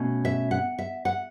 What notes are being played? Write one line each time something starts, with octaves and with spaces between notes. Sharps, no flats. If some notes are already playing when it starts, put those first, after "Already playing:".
Already playing: B2 A3 C#4
E5
F#5
E5
F#5